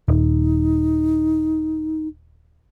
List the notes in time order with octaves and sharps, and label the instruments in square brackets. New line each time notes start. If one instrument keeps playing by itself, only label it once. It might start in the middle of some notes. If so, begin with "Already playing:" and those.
[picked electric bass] D#1 [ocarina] D#4